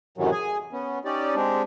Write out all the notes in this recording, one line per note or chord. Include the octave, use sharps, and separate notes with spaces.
F#2 A2 C3 D#3 E3 F#3
G#4 G#5
B3 C#4
C#4 D#4 G4 D5
G#3 C4 D4 G4